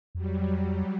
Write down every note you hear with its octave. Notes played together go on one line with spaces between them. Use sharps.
F2 F#3 G3